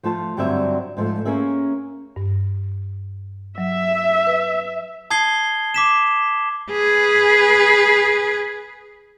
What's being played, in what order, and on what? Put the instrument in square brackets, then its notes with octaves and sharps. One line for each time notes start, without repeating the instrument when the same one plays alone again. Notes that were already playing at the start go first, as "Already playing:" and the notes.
[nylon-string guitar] F3 A3 F4 A5
G2 D3 F#3 G3 C4 E5
G#2 F3 A3
A#3 C#4 G#4 A#4 E5
[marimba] G2
[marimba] F#3 [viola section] E5
[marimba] B4
[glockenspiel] A5 D#6 G#6 C7 G7
D6 B6 E7
[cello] G#4 B4